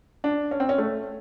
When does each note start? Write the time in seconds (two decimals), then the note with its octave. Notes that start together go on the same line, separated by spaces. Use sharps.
0.24 D4
0.51 C#4
0.60 C4
0.69 C#4
0.78 A3